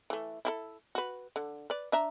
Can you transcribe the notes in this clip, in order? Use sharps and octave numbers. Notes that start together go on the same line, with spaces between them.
E3 A3
E4 G4 A4
F#4 B4
D3
B4 D5
D4 E5 A#5